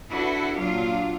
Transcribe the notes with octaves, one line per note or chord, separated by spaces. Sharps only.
D4 E4 F#4 A4 B4
A#2 F#3 D4 F4 F5